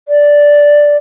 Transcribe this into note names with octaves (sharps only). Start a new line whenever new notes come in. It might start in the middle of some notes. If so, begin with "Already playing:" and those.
D5